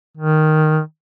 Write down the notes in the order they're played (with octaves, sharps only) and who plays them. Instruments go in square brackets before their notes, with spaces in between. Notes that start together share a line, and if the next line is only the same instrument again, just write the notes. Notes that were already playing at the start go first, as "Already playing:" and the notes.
[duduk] D#3